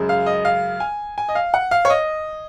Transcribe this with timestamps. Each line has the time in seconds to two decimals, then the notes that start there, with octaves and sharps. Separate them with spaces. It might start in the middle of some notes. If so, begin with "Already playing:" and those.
Already playing: F#2 C#3 G#3
0.09 F5
0.26 D#5
0.45 F5
0.80 G#5
1.18 G#5
1.29 D#5
1.35 F5
1.54 F#5
1.71 F5
1.85 C#5
1.90 D#5